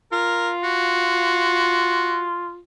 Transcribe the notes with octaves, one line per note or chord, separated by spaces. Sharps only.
F4 A#4
F#4